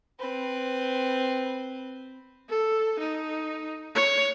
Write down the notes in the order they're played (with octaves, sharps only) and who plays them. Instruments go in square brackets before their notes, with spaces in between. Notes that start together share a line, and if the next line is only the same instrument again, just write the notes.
[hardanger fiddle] C4 B4
[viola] A4
D#4
C#5